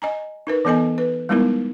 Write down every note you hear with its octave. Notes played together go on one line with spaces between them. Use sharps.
D#5 G#5 A#5
D#4 A#4 B4
E3 B3 A4 D#5 G#5
B4
G3 G#3 B3 D#4 E4 A#4